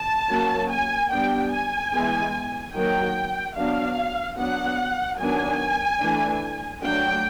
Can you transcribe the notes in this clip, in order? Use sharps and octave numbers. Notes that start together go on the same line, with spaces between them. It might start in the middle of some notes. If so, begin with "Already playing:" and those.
Already playing: A5
F#3 A#3 C#4
G#5
G3 B3 D4 G5
G#5
E3 G#3 B3
D#3 F#3 A#3 G5
F#3 B3 D4 F5
F#3 B3 D4 F#5
D#3 F#3 B3 D4 G#5
E3 A3 D4
F#3 A3 D4 G5